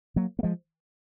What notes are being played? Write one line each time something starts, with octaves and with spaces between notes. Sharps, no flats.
F#3 A#3
A#3
F3 G#3